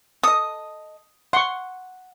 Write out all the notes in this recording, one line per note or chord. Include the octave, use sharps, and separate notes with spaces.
A4 D#5 D#6
F#5 C6 C#6